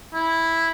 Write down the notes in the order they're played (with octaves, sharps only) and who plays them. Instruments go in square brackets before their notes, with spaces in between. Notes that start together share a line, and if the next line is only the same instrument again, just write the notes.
[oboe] E4